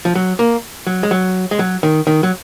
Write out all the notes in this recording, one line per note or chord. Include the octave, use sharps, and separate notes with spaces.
F3
F#3
A#3
F#3
G#3
F#3
G#3
F#3
D#3
D#3
F#3